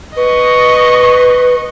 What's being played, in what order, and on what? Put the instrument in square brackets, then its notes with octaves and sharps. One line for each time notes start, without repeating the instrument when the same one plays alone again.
[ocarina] B4 [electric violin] D#5 C#6